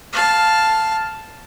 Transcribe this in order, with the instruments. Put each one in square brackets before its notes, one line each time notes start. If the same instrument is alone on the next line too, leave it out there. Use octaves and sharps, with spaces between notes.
[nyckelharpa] F5 A5